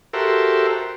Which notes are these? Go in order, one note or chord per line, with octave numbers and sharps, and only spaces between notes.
F#4 G4 A4 A#4 C5 E5